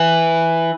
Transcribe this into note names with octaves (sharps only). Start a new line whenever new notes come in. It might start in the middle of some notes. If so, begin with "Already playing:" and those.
Already playing: E3